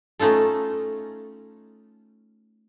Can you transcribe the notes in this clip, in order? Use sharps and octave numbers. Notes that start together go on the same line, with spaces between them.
A3 C#4 D#4 F4 A4